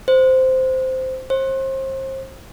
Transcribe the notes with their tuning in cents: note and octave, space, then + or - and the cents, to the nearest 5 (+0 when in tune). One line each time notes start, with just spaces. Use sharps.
C5 -10
C5 +30